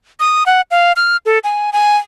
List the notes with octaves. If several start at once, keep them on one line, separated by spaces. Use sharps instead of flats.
D#6
F#5
F5
F6
A4
G#5
G#5